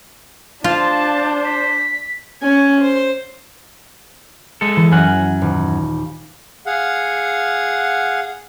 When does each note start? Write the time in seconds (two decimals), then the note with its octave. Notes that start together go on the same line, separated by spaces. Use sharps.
0.64 D4 F4 C5 A5
1.45 B6
2.42 C#4 G#5
2.81 C5
4.61 G#3 A4
4.76 E3
4.92 F#2 F#3 F#5 G#5 F6
5.41 D#1
6.66 G#4 F5 F#5